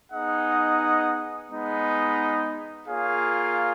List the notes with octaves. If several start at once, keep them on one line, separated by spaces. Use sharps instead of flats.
B3 D#4 G#4 D#5 F#5
G#3 B3 D#4
A#3 F4 G#4 C#5 F5